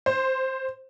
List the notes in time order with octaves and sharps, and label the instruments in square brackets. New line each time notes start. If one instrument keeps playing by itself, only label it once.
[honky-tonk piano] C5